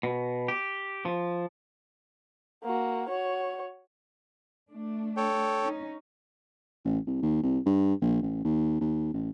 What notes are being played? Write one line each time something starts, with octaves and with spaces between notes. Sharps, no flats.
B2
G4
F3
A#3 F#4
F#4 C#5
A3 D4
A4 C#5 G5
C#4 D#4
A1
C2
D#2
C2
G2
A#1
A1
D#2
D#2
A1